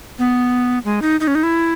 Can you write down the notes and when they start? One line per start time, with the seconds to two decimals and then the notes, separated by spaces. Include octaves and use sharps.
0.19 B3
0.85 G#3
1.02 D#4
1.20 D#4
1.28 C#4
1.35 D#4
1.43 E4